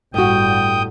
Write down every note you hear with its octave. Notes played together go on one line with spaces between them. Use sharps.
G1 A2 G3 F#4 G5 D#6 G6